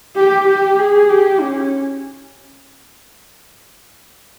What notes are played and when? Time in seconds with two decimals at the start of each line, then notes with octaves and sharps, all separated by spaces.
0.16 G4
0.48 G4
0.78 G#4
1.09 G4
1.40 C#4